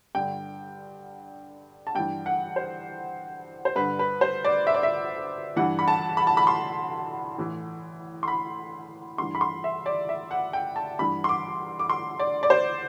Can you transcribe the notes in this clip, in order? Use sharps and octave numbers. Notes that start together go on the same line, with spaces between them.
G2 D3 G5
A5
G2 E3 G5
F#5
C5
C5
G2 D3 B4
B4
C5
D5
E5
D5
E5
G2 E3 F#5
B5
A5
B5
A5
B5
C6
A2 E3
C6
B5
G2 E3 C6
B5
C6
E5
D5
E5
F#5
G5
A5
G2 E3 B5
C6
D6
D6
C6
D5
D5
C5